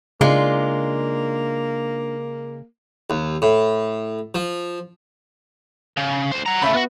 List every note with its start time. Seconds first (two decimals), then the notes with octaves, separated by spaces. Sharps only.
0.21 C#3 G#3 A#3 D4 D#4 F4 D5
3.10 D#2
3.42 A2
4.35 F3
5.97 C#3
6.31 D2 C5
6.46 F#5 A#5
6.62 C#3 A3 E5 B5
6.73 B3 F4 F#4